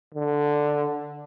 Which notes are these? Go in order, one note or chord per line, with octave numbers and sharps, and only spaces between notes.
D3